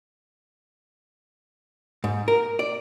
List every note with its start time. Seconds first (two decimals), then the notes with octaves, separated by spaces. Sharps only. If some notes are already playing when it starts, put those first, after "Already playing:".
2.04 G#2
2.28 A#4
2.59 D5